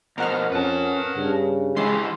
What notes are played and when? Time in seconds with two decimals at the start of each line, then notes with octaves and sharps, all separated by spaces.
0.18 B2 F3 A#4 F#5 F6
0.52 F2 C#4 B4 A5
1.17 G2 C#3
1.77 E3 G#3 E4 G4 C6